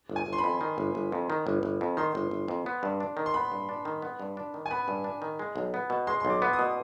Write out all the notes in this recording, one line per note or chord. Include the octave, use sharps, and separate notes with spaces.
G1
G#5
G1
C6
B5
F2
D#3
G1
G1
F2
D#3
G1
G1
F2
D#3 C6
G1
G1
F2
B3
G2
D4
D#3
C6
B3 B5
G2
D4
D#3
B3
G2
D4
D#3
G#5
B3 B5
G2
D4
D#3
G#3
B1
B3
B2
G#3 C6
B1 C6
D6
B3
D#6
B2